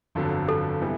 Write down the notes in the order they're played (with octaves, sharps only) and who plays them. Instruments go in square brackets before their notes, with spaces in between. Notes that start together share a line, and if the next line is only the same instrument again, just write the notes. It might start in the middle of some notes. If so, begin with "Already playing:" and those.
[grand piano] G1 F2 D3 F#3
[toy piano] A4
[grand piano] C3 E3 G3 B3